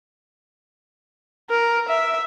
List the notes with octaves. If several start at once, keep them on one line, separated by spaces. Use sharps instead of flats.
A#4
E5